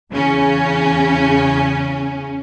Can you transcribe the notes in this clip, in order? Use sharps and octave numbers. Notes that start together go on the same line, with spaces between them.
E2 C#3 C#4